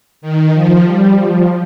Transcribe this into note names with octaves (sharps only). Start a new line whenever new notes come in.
D#3
F3
G3
F3